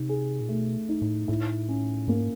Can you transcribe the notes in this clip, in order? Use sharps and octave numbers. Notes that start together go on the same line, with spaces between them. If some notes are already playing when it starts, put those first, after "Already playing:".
Already playing: C3 D#4
G#4
A#2
B2 A3
D#4
A2
A2 E4
C#4
G#2 A#3